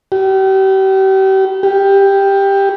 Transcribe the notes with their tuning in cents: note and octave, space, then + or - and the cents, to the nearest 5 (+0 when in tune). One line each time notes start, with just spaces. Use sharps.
G4 -35
G4 +10